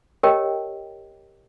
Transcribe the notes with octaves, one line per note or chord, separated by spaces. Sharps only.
G4 A#4 C#5 D#5 G5 A5